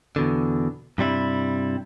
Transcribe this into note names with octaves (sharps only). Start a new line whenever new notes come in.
E2 B2 D3
G2 C3 G3 E4